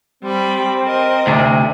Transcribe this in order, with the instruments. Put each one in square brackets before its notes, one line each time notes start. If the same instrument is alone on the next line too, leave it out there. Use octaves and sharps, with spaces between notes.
[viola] G3 B5 [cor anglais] C4
[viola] A#4 D#5
[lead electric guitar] D2 C3